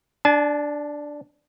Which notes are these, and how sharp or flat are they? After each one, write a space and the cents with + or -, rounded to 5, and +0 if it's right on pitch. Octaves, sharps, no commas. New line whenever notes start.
D4 +0 A5 -40